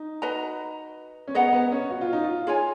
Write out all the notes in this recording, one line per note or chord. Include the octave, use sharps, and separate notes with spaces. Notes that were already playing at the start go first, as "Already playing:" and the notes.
Already playing: D#4
F#4 B4 D#5 A#5
C#4
B3 G#4 D#5 F#5 A#5
B3
C#4
F#4
F4
D#4
F4
F4 G#4 C#5 G#5